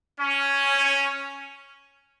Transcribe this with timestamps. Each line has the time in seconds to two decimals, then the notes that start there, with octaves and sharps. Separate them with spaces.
0.20 C#4